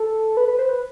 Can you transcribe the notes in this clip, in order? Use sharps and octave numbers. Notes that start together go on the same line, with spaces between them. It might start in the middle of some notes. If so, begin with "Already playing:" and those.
Already playing: A4
B4
B4
C5
B4